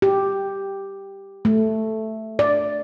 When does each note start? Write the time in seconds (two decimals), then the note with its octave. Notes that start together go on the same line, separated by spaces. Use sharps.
0.02 G4
1.45 A3
2.39 D5